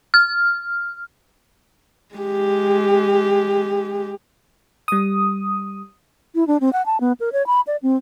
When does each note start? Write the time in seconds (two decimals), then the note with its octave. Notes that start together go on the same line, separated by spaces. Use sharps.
0.14 F6
2.15 G#3 G4
4.88 G3 D#6
6.35 E4
6.47 D4
6.61 C4
6.73 F#5
6.86 A5
7.01 B3
7.20 A#4
7.33 C#5
7.47 B5
7.67 D5
7.83 C4